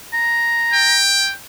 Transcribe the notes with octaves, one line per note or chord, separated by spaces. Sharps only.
A#5
G5